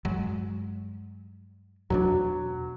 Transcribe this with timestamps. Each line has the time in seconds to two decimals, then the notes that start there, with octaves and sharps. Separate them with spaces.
0.05 G2 F#3 G#3
1.90 E2 B2 F#3 D4